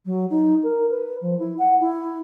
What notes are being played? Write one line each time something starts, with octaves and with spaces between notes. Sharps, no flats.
F#3
D#4
A#4
B4
F3
E4
F#5
E4